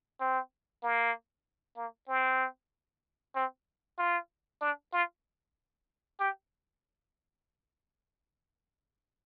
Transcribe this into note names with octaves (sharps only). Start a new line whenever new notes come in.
C4
A#3
A#3
C4
C4
F4
D4
F4
G4